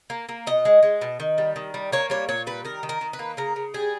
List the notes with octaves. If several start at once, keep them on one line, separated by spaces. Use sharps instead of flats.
A#3
A#3
B2 D#5
G#3
G#3
B2
D#3
G3
D#3
G3
A#3 C#5
G3 C#5
A#2 C#5
G3 B4
D#3 A#4
D#3
A#4
D#3
B4
A#3
C#3 A#4
C#3
G3 G#4